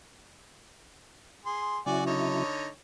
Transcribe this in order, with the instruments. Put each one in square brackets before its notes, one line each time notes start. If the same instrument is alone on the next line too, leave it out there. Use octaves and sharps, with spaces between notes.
[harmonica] G#4 C6
[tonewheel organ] C#3 F#3 E4 [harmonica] F#4 D5 G#5
[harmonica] D3 D#4 C#5